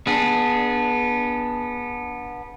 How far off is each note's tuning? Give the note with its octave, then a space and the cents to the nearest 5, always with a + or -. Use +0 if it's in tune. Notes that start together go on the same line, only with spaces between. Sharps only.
B3 -25 D4 +0 G#4 +0